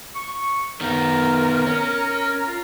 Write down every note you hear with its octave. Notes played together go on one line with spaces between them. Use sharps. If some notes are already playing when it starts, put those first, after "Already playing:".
C#6
D#3 B3 A#4
C#4
F4